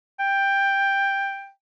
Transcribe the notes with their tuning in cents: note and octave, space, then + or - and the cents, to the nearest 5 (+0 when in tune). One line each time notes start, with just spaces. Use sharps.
G5 +10